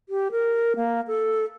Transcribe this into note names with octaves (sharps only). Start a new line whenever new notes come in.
G4
A#4
A#3
A4